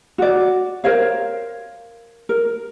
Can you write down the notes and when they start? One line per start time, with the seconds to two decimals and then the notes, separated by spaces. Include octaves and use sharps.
0.18 F#4 D5
0.84 A#4 C5 C#5 F5
2.29 A#4